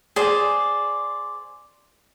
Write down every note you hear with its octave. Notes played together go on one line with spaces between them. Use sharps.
G#4 C5 D5